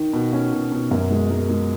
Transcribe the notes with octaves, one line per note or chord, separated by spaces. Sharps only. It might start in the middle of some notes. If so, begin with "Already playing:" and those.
Already playing: D#3
B2
C#4
B2
B2
F#2 A#4
G#3
G#3 A#4
G#3